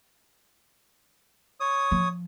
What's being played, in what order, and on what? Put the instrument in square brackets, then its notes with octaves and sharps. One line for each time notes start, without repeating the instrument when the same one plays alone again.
[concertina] C#5 D#6
[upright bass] F3